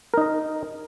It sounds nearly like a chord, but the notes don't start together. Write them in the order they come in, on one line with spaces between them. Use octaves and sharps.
A#4 D#4 D#5